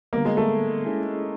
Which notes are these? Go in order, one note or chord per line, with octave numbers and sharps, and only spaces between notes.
D3 G3 A#3 B3
G#3
A3
G#3 C#4 E4 G#4